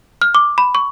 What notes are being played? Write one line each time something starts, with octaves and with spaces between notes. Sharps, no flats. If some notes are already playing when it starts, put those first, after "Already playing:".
F6
D6
B5
C#6